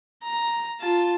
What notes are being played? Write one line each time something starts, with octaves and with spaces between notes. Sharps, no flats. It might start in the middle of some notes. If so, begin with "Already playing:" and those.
A#5
F4 A5